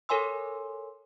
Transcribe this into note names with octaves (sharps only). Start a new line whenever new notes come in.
A4 A#4 C#5 G#5 C6 E6